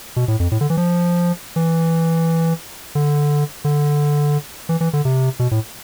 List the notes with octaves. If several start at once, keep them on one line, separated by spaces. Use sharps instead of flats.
B2
A2
F2
A2
D3
E3
F3
E3
D3
D3
E3
E3
D3
C3
B2
A2